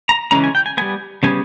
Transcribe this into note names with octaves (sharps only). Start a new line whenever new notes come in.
A#5
C#3 E3 G#3 C#4 A#5
G#5
G5
G#5
G3 B3 G#5
C#3 G3 B3 G#5